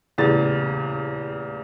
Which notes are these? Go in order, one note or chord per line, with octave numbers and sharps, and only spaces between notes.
D#1 E2 A2 C#3 A6